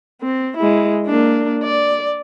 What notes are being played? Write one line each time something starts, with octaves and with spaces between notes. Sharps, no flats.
C4
G#3 E4
A#3 D4
D5